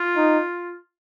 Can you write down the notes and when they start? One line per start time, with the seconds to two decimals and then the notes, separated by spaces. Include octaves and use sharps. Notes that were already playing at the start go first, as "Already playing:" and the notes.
Already playing: F4
0.16 D#4